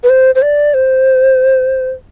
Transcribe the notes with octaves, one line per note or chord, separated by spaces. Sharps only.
B4
C5
C5
D5
C5